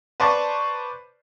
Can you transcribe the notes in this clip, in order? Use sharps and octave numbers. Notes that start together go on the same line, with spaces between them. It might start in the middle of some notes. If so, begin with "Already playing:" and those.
B4 C5 D5 A5 C#6